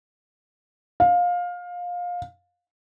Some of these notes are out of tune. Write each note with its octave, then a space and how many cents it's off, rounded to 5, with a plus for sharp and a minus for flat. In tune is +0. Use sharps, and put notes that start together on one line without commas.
F5 +20